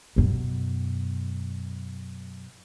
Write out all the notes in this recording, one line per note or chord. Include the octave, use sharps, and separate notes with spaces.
F#2 B2